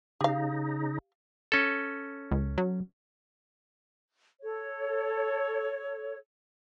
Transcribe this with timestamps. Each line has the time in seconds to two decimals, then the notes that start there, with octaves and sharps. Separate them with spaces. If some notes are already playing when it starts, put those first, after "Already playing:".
0.21 C#3 D#4 G4 F5
1.52 C#4 A4
2.31 C#2
2.58 F#3
4.42 A4 C#5